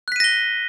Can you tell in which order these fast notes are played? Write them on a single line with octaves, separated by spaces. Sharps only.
F#6 B6 D#7 A#6 G7